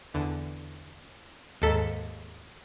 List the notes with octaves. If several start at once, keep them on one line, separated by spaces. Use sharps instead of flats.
E2 D3
D#2 G#2 A4 B6